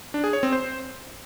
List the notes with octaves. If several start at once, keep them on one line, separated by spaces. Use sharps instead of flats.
D4
G#4
C#5
C4
C5